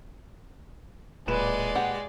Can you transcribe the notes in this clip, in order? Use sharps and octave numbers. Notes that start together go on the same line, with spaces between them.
D1 A#2 G#3 B4 D5 E7
G4 F#5